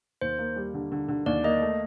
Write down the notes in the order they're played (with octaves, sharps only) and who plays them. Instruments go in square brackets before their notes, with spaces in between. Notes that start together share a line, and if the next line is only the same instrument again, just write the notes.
[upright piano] D#2 [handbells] C5
[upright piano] A#3
G3
D3
D3
D3
[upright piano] D#2 [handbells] D5
[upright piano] A#3 [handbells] D#5
[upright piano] A3